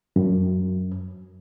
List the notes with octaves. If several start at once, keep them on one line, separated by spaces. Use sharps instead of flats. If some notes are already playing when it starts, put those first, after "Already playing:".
F#2